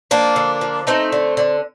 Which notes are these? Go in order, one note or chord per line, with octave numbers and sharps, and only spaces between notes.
F3 A#3 D4
D3
F3
A3 C4 D#4
D3
D3